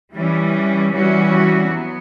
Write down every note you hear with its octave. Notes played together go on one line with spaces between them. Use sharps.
E3 G3 C#4
E3 G3 C#4 F#4
F#3 B3